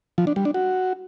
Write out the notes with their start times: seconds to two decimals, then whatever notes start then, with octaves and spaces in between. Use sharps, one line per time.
0.18 F3
0.27 D4
0.36 G3
0.45 D4
0.54 F#4